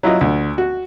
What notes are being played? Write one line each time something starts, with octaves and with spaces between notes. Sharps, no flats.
F#3 E4 F4 D#5
D2
F#4